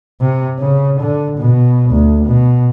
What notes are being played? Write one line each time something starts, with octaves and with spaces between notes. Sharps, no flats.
C3
C#3
D3
B2
D2
B2